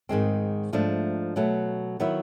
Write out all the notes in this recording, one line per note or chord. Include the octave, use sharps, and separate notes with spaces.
G#2 D#3 G#3 C4
G#2 F3 A3 D4
B2 F#3 A3
D#3 F#3 B3 E4